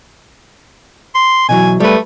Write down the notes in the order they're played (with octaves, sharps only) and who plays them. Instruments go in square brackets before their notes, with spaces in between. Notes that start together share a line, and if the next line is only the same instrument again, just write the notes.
[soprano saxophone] C6
[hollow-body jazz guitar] B2 E3 F#3 [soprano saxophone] G#5
[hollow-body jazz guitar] G3 B4 [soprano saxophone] A3